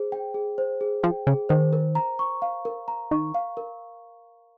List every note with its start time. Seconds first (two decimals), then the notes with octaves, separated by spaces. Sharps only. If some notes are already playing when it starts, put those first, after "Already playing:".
Already playing: G#4 C5
0.12 G5
0.34 G#4
0.58 C5
0.81 G#4
1.03 F3 G5
1.27 C#3 G#4
1.49 D#3 C5
1.73 A#4
1.95 A#5
2.19 C#6
2.42 F5
2.65 A#4
2.88 A#5
3.11 D#3 C#6
3.34 F5
3.57 A#4